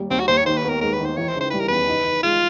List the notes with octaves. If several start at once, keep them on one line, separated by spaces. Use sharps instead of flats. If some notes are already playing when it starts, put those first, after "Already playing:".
Already playing: D#2 G3
D#2 C4
F#4
D#2 C5
C#5
D#3 C5
B4
B3 A#4
G#3 A#4
B4
D#3
C5
E3 C#5
C5
C#3
C5
G3 B4
A#4
E2 B4
D#4
D#4
G#3 F4